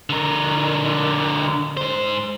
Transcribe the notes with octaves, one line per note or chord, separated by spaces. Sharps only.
D3 A#4
G#2 C5